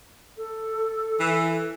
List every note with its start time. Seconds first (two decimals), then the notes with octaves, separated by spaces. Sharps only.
0.37 A4
1.20 E3